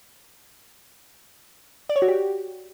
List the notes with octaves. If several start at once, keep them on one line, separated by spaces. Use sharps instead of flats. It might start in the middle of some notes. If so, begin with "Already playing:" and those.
D5
C#5
F#4
G4